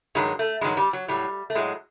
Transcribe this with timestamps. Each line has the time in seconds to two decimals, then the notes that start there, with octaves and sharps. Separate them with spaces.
0.15 G2 D#3 F#3 G#3
0.39 A3
0.61 G2 D#3 F#3 G#3
0.77 G3
0.93 F#3
1.08 A2 F#3 G3
1.50 A3
1.55 A2 F#3 G#3